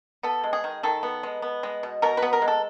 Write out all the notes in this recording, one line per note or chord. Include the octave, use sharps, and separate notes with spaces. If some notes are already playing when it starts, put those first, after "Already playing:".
B3 A4
G#3
G#4
D#3
D#3 A4
B3
G#3
B3
G#3
B2
B2 A#4
B4
B3
A#4
G#3
A4